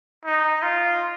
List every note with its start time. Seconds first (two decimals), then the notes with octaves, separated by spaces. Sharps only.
0.25 D#4
0.63 F4